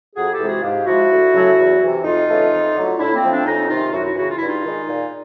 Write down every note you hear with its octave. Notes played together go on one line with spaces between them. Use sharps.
F2 F#4 G#4
G4 A4
C3 E3 G#3
F#4 G#4
G#2 F4 G4
F3 G#3 E4 F#4
D2
C#3 F#3 A3
E2
C3 E3
F2 D#4 F4
C#3 E3 A3
F2
D3 F#3 A3
A2 D4 E4
A#3 C4
F3 A3
C4 D4
F2 C#4 D#4
C3 D#3 D#4 F4
F#2 E4 F#4
E4 F#4
C#3 E3 E4 F#4
F4
G2 E4
D#4 F4
D#3 G#3
A#2